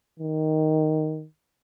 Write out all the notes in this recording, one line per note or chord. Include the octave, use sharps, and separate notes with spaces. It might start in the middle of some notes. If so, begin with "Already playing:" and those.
D#3